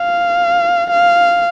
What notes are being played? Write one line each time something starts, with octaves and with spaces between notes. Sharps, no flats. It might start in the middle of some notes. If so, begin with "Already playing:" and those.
Already playing: F5
F5